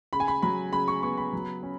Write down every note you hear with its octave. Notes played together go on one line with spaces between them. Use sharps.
C#3 B5
G#5
B5
F#3 B5
C#3 B5
C#6
B3 C#6
B5
F#3
C#4